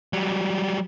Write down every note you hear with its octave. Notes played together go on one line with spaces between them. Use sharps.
F#3 G3